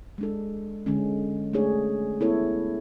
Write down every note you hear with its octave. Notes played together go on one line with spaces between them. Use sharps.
G#3 D4 A4
D3 G#3 C#4
A3 D4 G#4 C#5
B3 E4 A4 C#5